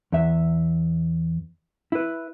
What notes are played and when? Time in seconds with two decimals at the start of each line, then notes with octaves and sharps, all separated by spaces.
0.12 E2 E5
1.92 E4 B4